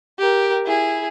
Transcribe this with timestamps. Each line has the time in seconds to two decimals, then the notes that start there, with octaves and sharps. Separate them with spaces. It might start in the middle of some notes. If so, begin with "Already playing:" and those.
0.19 G4 A#4
0.65 E4 G#4